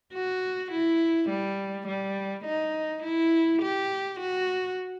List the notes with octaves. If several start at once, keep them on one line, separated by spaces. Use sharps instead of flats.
F#4
E4
G3
G3
D#4
E4
G4
F#4